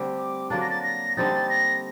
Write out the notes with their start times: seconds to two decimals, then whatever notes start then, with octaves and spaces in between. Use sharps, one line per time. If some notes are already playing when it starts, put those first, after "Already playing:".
Already playing: D3 G3 A3 C4 G4
0.18 D6
0.50 D3 F#3 A#3 D4 A6
0.61 A#6
0.70 A6
0.83 A#6
1.17 D3 G3 C4 D#4 A6
1.50 A#6